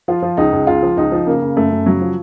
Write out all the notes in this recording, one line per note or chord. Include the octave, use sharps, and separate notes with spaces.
F3 F4
F3
C#2 D#4
C#2
C#2 F4
F3
C#2 D#4
F3
C#3 A#3
C#3
F#2 A3
F#2
C#3 F#3
F3